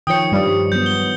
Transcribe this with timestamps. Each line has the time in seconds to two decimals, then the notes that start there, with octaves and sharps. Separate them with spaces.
0.07 D#3 F3 C#5 G5 D#6 C#7
0.32 G2 G3
0.72 F#3 B3 G6
0.86 G7